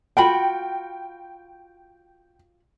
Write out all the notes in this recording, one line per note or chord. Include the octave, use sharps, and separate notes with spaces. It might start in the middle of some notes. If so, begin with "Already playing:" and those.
F4 F#4 G5 B5